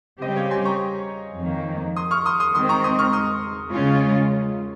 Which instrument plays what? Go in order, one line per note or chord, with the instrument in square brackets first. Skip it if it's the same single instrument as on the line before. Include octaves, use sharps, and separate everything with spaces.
[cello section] C#3 G3 C4 G4 [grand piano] C5 D#5
[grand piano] C#5 F5
G#5 C6
A#5 C#6
[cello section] F2 D#3 A#3
[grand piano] C6 D#6
C#6 F6
C6 D#6
C6 D#6
[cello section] D#3 G#3 C4 [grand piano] C6 D#6
[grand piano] A#5 C#6
C6 D#6
C#6 F6
C6 D#6
[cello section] C#3 G#3 C#4 F4